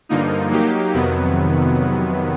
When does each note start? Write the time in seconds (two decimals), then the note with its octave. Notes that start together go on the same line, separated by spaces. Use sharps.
0.09 G2 D3 F3 A#3 D#4
0.51 F#3 A#3 D#4 G4
0.94 F2 C3 D#3 F#3 B3